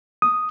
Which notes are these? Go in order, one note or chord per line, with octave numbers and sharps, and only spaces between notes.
D#6